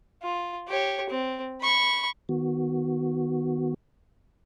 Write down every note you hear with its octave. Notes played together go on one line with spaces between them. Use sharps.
F4
G4 C#5
C4
B5 C#6
D#3 B3 F#4